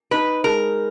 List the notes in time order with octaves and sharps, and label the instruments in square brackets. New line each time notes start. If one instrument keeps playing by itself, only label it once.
[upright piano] D#4 [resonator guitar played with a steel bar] B4
[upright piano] G#3 [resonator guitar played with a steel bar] A#4